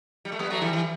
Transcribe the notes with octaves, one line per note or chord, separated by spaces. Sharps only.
G3
A3
G3 B3
F#3 A3
E3 G3
E3 G3